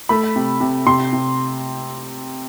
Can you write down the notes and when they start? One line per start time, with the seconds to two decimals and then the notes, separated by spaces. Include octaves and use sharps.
0.09 A3 B5
0.36 C3
0.61 C3
0.87 C3 C6
1.13 C3